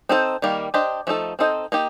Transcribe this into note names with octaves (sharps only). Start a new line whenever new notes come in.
C4 D#4 A4 C5
D#3 G3 A#3
D4 G4 C5 D#5
F3 A3 D#4 A4
C4 D#4 A4 C5 D#5
A#3 D#4 G4